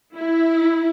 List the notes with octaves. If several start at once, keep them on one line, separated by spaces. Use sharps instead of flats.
E4